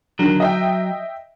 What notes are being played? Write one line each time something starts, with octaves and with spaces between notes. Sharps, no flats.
D3 D#3 F#3
D#5 E5 G5